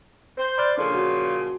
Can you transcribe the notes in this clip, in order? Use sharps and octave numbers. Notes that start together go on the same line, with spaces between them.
C5
D5 B5 F6 F#6
A#2 C#3 F3 D4 A4
F#4